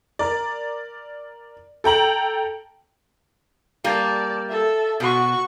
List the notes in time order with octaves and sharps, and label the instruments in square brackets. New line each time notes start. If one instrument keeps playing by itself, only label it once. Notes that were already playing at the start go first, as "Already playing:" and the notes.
[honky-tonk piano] A#4 D5
A4 G5 A#5 F#7
[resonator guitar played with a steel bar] G3 A#3 [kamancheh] D5 A5
[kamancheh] A4 E5
[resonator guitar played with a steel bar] B2 [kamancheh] F#4 C#6